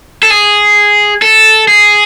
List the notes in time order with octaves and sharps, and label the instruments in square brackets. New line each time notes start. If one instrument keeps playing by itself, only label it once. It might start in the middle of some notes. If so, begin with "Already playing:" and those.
[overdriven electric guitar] A4
G#4
A4
G#4